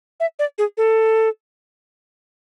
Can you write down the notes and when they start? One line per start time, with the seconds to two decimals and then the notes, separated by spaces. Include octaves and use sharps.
0.20 E5
0.39 D5
0.58 G#4
0.77 A4